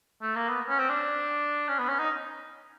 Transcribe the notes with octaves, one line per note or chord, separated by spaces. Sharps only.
A3
A#3
B3
C#4
C4
D4
C#4
B3
C#4
D#4